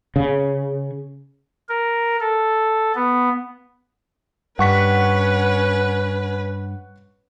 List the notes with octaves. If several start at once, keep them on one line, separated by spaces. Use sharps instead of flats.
C#3
A#4
A4
B3
G2 C#4 B4 F#5 C#6 B6